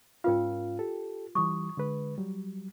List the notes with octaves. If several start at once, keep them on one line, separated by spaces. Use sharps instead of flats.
G#2 C#4 F4 A#4 F5 G5
G4 A4
E3 G3 C#6 D#6
D3 G#3 B4
F#3 G3